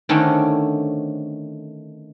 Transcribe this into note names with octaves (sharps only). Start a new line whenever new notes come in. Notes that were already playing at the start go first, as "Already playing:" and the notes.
D3 D#3 A3 C4 C#4